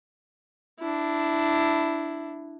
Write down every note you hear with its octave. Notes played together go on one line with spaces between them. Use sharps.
D4 E4